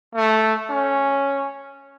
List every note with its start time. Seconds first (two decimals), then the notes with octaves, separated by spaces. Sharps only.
0.15 A3
0.70 C#4